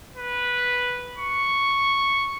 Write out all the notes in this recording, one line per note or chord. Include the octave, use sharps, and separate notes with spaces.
B4
C#6